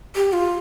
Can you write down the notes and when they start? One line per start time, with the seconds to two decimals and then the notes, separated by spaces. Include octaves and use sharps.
0.15 G4
0.33 F4